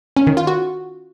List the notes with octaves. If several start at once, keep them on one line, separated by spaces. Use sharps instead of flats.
C#4
D#3
F4
F#4